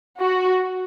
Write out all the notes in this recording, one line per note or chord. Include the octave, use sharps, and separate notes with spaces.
F#4